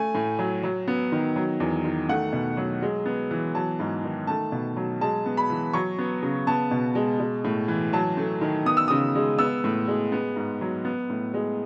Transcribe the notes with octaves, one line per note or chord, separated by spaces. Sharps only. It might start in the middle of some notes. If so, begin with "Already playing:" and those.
Already playing: A3 G#5
A2
F#3
F#3
B3
D#3
F#3
E2
D#3
A3 F#5
B2
F#3
G#3
B3
E3
F#3 A5
G#2
D#3
A3 A5
B2
F#3
G#3 A5
B3
B5
E3
F#3 C#6
B3
C#3
B3 A5
B2
G#3
G#3
A2
E3
F#3 A5
A3
D#3
B3 D#6
E6
C#3 D#6
G#3
B3 E6
A2
G#3
B3
G#2
F#3
B3
A2
G#3